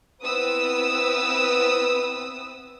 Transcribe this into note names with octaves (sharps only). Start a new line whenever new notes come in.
B3 C4 E4 B4 D#6 E6